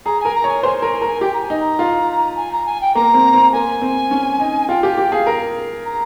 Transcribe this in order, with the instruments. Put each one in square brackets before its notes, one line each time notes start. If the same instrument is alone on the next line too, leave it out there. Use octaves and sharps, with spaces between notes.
[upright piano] G#4 [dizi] A#5
[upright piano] A#4 [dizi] G#5
[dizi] A#5
[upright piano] C#5 [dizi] G#5
[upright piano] C5 [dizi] G#5
[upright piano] A#4 [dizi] G#5
[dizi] G#5
[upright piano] A#4
[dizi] G#5
[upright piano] G4 [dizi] G5
[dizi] A#5
G#5
[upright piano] D#4
[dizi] A#5
[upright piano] F4
[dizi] G#5
A#5
G#5
G5
[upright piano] A#3 [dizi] A#5
[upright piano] C4
C4
[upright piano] A#3 [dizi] G#5
[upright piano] C4
C#4
D#4
[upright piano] F4 [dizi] G5
[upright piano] G4 [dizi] G#5
[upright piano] G4 [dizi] G5
[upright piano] G#4 [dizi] F5
[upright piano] A#4
[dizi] A#5